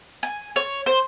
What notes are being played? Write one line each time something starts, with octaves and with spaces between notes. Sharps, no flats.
G#5
C#5
C5